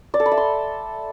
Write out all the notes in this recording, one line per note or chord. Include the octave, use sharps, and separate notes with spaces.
D5
A4
B5
E5
C6